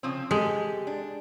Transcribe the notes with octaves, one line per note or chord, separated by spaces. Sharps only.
C#3 F3 C4
G#3 G4 A4
D4